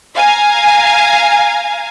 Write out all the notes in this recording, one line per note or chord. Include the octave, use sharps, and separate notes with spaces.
F5 G#5 A#5